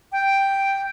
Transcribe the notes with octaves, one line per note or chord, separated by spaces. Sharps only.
G5